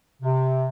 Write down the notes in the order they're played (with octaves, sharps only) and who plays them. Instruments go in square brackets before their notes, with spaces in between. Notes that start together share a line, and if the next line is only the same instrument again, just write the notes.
[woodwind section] C3